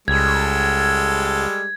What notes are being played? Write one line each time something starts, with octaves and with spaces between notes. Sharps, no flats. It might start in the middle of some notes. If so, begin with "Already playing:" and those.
C#2 G3 G#3 A4 G#6